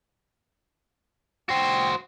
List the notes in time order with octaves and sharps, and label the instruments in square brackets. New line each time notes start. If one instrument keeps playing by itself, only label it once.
[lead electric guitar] F#4 C5 [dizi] G5